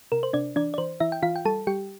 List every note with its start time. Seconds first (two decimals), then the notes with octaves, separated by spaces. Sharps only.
0.12 C3 A#4
0.23 C5
0.33 C3 D4 D5
0.56 E3 D4 D5
0.74 D5
0.78 E3 C5
1.00 E3 E4 E5
1.12 G5
1.23 E3 F4 F5
1.36 G5
1.45 G3 A4 A5
1.67 G3 G4 G5